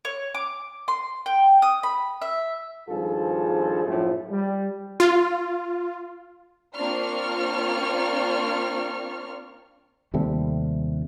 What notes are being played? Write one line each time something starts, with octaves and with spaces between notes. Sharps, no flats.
C#5
D6
C6
G5
D#6
B5
E5
G#1 G2 F3 F4 G#4 A4
A#1 F#2 A2 F3
G3
F4
A#3 C4 D4 F4 C#6 F6
D#2 C3 G3 A3